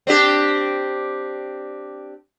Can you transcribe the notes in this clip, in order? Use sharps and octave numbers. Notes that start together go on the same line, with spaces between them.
C4 D4 G4